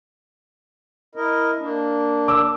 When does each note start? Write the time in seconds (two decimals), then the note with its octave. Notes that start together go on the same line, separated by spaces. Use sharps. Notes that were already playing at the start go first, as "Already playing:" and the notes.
1.15 E4 A#4 D#5
1.59 A#3 D4
2.28 D6 E6